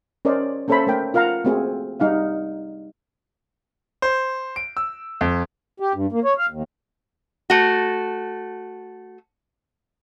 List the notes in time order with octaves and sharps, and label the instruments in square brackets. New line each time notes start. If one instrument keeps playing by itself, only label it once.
[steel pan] C#4 A#4 C5 D5 D#5
A#3 C#4 A4 C5 E5 B5
A3 A#4 G5
F4 A#4 F5 F#5 A#5
A3 A#3 C4 F#4 G#4
G3 D#4 F5 F#5
[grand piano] C5
D7
E6
F2
[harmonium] G4
G2
A#3
C#5
F5
D#2
[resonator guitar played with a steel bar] A3 F#4